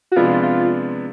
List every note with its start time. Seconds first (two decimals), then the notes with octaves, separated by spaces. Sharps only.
0.12 F#4
0.16 C3 F3 G#3 B3 D4 F4
0.43 F4